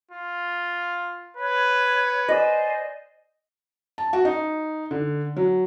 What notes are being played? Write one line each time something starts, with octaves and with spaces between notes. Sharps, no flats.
F4
B4 C#5
C5 D5 D#5 G#5
A5
F#4
D#4
D3
F#3